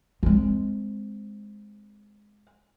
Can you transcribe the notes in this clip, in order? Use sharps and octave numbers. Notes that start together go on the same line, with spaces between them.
G#3 C4